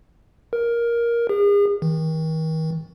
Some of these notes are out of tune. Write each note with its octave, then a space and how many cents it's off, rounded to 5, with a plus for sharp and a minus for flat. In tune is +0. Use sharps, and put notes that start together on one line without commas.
A#4 +10
G#4 -40
D#3 +40